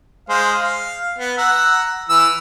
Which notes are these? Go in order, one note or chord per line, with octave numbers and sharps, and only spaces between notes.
G#3 C5 F5
F5
B3
F#5 A#5 E6
E3 E6